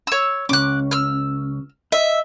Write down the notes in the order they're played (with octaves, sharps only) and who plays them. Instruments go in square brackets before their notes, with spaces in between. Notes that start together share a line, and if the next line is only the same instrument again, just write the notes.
[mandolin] C#5 E6
[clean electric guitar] C#2 G#2 C#4 [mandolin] D6 F#6
[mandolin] E6 F6
[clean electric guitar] D#5 [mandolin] E5